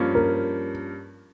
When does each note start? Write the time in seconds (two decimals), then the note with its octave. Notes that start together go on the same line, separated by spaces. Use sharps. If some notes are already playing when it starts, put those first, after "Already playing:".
Already playing: G2 F3 A#3 C#4
0.15 A#4